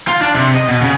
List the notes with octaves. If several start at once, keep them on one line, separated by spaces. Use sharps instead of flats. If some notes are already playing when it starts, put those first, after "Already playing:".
F4
D4
C3
D#5
B2
C#3